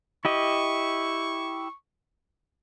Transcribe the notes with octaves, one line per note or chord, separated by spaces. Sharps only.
E4 G4 D#5 C#6